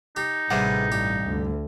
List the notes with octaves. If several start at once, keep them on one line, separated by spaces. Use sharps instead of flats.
D#4 G4
A1 C3 G3 G#4 B4 F#5
C2 G2 G4
D2